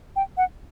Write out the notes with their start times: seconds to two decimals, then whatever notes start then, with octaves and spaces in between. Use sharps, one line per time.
0.16 G5
0.37 F#5